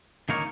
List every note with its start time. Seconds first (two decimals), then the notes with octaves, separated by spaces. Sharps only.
0.29 D#3 A#3 D#4 A#4 C#5